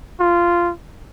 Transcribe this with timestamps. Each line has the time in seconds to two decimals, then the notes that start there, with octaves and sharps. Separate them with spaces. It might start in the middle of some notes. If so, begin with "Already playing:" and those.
0.20 F4